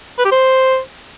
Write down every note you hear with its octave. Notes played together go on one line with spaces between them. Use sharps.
B4
G4
C5